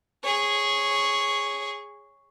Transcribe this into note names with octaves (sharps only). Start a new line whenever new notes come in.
G#4 C#5